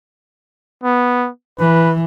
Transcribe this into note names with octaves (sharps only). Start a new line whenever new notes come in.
B3
E3 B4